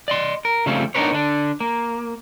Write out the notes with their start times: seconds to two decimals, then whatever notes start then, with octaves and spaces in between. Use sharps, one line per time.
0.08 D5 D#5 C6
0.45 A#4
0.66 C#3 F3 G3 A3 C4 C#4
0.95 B3 D4 D#4 A#4 B4 C#5
1.12 D3 D4
1.60 A#3